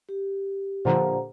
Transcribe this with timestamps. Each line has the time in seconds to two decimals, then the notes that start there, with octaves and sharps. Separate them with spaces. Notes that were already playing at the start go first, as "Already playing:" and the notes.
0.09 G4
0.85 A#2 D3 F3 C5 F#5 A#5